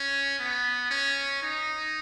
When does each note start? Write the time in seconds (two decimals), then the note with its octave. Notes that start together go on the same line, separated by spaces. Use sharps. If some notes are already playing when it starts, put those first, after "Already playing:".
Already playing: C#4
0.39 B3
0.91 C#4
1.43 D#4